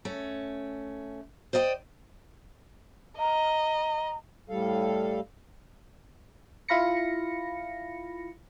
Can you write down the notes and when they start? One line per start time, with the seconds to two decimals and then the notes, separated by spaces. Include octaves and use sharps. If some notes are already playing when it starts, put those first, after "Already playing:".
0.05 A3 C#4
1.53 C5 D5 D#5 F#5 G5
3.19 D#5 A#5
4.49 A2 G3 A4 F5
6.69 E4 F4 F5 B5 A#6 C#7